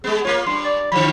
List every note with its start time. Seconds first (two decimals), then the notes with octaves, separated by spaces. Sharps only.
0.04 G#3 B3 G#4
0.25 A#3 F4 C#5
0.47 G2 C6
0.65 D5
0.92 D3 F3 B5